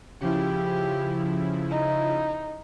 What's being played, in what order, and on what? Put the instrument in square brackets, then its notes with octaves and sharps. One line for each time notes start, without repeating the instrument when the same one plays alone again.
[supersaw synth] C#3 F3 E4 [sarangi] G4
[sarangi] D#4